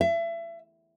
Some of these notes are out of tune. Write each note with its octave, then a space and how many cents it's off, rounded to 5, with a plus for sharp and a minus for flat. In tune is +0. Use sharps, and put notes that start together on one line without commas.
E5 +30